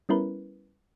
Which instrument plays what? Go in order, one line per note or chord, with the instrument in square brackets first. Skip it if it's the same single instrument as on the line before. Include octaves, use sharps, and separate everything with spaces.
[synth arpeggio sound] G3 B3 C#4 E4 A#4 B4